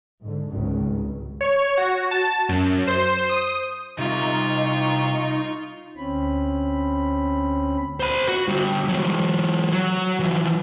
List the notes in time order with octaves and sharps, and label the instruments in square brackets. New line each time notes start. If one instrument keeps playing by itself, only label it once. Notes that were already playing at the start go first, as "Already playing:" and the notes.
[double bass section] G#2 D3
G#1 C#2 G2 C#3
[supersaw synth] C#5
F#4
A5
F#2
C5
D#6
[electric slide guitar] C3 G3 [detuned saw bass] D#4 [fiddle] F4 C#6
[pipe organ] D2 C4 C#4 B5
[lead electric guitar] C5 B5
F#4
D3 G3
E3 F#3
F#3
E3 F3